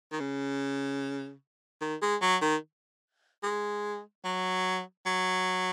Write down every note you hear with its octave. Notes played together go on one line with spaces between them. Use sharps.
D#3
C#3
D#3
G#3
F#3
D#3
G#3
F#3
F#3